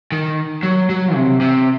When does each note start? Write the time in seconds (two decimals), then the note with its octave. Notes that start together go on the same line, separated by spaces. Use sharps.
0.12 D#3
0.63 F#3
0.90 F#3
1.15 C3
1.41 C3